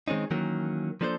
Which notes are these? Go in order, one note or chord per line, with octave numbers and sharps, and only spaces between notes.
D#3 G#3 C4 C#4 D#4
D#3 E3 F#3 A#3 C#4
F3 A#3 D4 A4 B4 C5